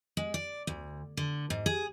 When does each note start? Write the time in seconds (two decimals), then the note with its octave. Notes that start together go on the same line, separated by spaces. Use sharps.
0.17 G#3
0.34 D5
0.67 D2
1.17 D3
1.50 G#2
1.66 G#4